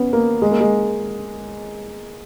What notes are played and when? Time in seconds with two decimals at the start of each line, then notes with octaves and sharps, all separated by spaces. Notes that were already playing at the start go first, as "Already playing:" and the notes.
Already playing: B3 C#4
0.13 A#3
0.42 G#3
0.51 A#3
0.61 G#3